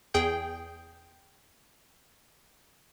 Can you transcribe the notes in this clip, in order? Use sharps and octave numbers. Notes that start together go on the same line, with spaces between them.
E2 G#4 G5 G6